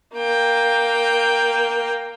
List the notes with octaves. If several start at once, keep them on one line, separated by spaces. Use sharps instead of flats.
A#3 G5